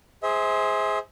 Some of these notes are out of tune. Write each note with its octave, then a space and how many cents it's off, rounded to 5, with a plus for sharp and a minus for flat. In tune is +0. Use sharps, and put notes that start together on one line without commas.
G#4 +0 C5 +0 E5 -40